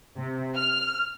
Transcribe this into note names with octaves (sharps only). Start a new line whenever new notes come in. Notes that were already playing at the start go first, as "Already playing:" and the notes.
C3
F6